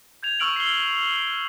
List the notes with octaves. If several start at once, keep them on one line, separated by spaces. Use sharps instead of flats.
G6 G#6 F7
C#6 E6 F6 D7 F#7
C7 G7